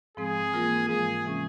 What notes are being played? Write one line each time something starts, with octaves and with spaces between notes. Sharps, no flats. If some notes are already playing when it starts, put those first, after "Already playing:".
G#2 F3 G#3 C4 G#4
E3 A#3 F4 A#4
G#2 F3 G#3 G#4
C3 E3 G#3 C#4